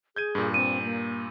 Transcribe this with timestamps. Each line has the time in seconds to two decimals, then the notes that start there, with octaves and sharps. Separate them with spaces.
0.16 G#4 G6 G#6 D#7
0.35 G2 A#2
0.54 C4 D#7
0.83 A#3